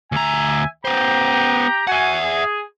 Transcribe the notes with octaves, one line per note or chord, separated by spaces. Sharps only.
D2 E5 G#5 A#5
B3 G4 C5 G5 A#5
F#4 E5 F#5 G#5
G#4